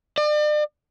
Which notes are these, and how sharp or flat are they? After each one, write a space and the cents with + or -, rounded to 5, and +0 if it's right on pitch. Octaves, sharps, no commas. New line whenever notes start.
D5 +40